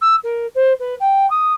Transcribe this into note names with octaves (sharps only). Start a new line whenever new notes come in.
E6
A#4
C5
B4
G5
D#6